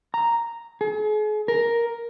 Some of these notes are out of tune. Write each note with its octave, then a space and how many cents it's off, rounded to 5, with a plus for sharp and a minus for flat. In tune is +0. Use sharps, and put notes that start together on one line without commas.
A#5 -5
G#4 +40
A#4 +5